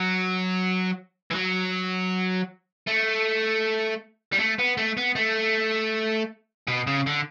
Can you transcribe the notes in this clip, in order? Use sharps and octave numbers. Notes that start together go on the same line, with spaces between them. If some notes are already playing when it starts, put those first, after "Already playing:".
Already playing: F#3
E3
F#3
A3
G3
A3
B3
A3
B3
A3
B2
C#3
D3